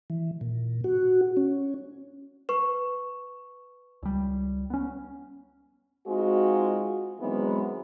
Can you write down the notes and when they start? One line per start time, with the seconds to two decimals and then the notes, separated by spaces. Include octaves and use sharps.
0.10 E3
0.41 A#2
0.84 F#4
1.37 C#4
2.49 B4 C#6
4.03 C#2 G3
4.70 B3 C#4
6.07 G#3 C4 D#4 F4 F#4
7.20 D#3 E3 F#3 G#3 B3 C4